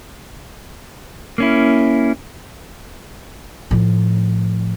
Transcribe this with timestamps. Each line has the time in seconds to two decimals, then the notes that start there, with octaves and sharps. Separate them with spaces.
1.38 A#3 C#4 E4
3.71 A2 F3